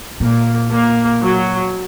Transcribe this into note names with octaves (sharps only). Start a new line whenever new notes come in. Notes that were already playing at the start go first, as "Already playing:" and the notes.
A#2 A#3
A#3
F#3